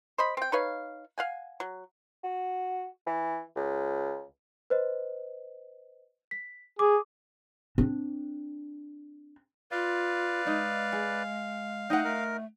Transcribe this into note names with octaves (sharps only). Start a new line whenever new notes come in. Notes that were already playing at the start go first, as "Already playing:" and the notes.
C5 D#5 B5
C4 G5
D#4 B4 C#5 F5
F5 F#5 G#5
F#3
F#4
E3
C#2
B4 C5 D#5
B6
G#4 D6
C4 D4
F4 B4 D5 F5
G#3 D#4
G#4
A3 D#4 D#5 F#5 G5
A3 A#4